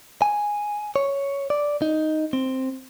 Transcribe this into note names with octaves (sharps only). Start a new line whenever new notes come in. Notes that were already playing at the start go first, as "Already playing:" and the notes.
G#5
C#5
D5
D#4
C4